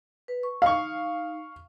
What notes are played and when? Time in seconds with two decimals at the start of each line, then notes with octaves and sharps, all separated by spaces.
0.28 B4
0.43 C#6
0.62 D#4 F5 C#6